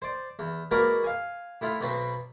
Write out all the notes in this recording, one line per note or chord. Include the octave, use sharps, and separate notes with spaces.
C5 D5
E2
G#3 A#3 F#4 A#4 B4 D5
F5 G#5
A2 E4 F4
B1 B2 F#3 C4 B4